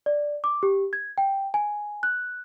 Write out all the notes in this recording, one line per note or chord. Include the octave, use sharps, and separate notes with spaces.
D5
D6
G4
G#6
G5
G#5
F#6